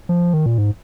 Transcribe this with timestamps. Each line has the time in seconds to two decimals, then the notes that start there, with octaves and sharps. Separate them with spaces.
0.09 F3
0.34 D#3
0.46 A#2
0.58 G#2